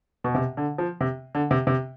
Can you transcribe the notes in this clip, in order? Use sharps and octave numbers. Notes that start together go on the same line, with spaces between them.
B2
C3
D3
F3
C3
D3
C3
C3